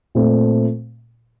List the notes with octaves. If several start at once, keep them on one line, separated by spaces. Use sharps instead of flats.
A#2 A3 C4